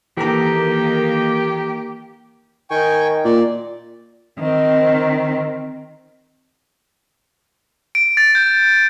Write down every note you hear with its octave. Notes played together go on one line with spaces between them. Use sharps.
D#3 E3 A#3 G4 A4 A#5
D#3 G5 G#5 C#6
A#2 D5
D#3 C4
D7
A6
G6